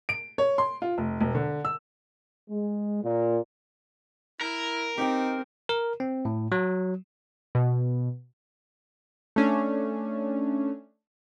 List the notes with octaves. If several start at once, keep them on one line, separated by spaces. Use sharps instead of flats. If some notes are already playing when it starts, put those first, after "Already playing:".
D7
C#5
C6
F4
F1
E1
D3
E6
G#3
A#2
E4 A#4
C4 D#4 G4 G5
A#4
C4
A2
F#3
B2
A3 C#4 D4